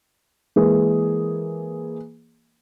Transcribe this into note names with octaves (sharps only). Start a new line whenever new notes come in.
E3 G#3 A#3 G#4